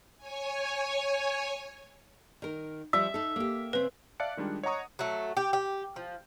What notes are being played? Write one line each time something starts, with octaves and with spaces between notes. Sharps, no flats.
C#5 G#5
D#3 A#4
F3 G3 E5
D#4 A4
A#3 G4
C#3 C4 B4
D5 E5 F5 A5 F#6 C#7
D#3 G3 G#3 D4 F4
C#5 D#5 F#5 A#5 C#6 D#6
F#3 A3
G4
G4
F3